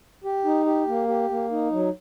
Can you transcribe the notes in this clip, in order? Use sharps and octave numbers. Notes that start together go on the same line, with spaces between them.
G4
D#4
G4
A#3
G4
A#3
D#4
F#3